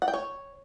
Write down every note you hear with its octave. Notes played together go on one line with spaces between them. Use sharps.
F#5
G5
C#5